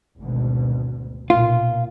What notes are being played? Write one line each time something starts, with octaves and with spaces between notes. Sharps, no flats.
G#1 D2 B2
B1 A#2 F4